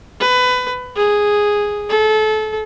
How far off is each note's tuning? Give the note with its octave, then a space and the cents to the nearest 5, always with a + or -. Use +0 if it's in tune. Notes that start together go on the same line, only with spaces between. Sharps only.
B4 +20
G#4 -5
A4 -30